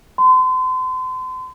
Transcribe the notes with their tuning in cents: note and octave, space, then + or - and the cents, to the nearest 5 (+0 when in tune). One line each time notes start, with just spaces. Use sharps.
C6 -35